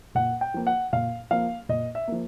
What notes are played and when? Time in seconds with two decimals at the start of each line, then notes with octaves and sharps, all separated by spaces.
0.15 A#2 F#5
0.41 G5
0.54 F3 A#3
0.67 F#5
0.93 A#2 F5
1.31 F3 A#3 F5
1.69 A#2 D#5
1.95 E5
2.08 F3 A#3